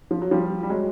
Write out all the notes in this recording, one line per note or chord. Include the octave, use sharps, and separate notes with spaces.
F3
F#3
F3 G3
G3
F#3 G#3